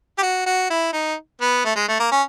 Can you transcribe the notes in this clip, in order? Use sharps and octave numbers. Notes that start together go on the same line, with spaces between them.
G4
F#4
F#4
E4
D#4
B3
A3
G#3
A3
A#3
C#4